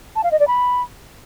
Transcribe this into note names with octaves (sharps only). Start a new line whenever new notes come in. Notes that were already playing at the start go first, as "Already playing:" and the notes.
A5
F5
D#5
D5
B5